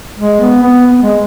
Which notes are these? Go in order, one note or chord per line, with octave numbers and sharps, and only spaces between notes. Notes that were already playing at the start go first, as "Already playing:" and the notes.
G#3
B3
B3
B3
G#3